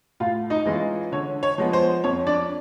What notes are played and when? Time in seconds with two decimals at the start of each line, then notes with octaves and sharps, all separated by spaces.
0.20 A2 F4 F5
0.50 D#4 D#5
0.66 E3 G#3 C#4 F4
1.12 D3 C#5
1.43 C#5
1.58 F3 G#3 B3
1.73 C5
2.04 F2 C#5
2.27 D4 D5